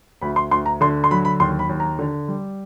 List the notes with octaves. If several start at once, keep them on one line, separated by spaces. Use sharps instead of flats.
D2 B5
C6
D2 C6
A#5
D3 C6
C6
F#3 B5
B5
D#2 C6
B5
D#2
A#5
D3
G3